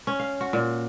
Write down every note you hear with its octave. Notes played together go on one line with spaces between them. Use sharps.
C#4
F5
F#4
A#2